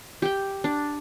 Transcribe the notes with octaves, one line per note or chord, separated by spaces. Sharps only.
G4 G5
D4